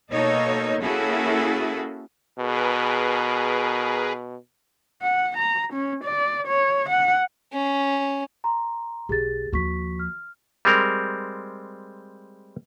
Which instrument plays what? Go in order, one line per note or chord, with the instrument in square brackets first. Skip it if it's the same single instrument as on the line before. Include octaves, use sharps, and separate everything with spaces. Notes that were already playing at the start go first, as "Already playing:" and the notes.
[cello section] B2 A#3 D#4 A4 C#5
A#3 C#4 E4 F#4 G#4 A4
[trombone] B2 [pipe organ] G#4 A#4 B4
[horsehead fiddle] F#5
A#5
C#4
D5
C#5
F#5
[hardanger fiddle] C#4
[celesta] A#5 C6
[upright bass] B1 [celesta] G4 G#4 A6
[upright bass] D#2 F3 [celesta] F#4 C#6 B6
[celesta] F6
[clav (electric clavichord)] G3 G#3 C4 A#4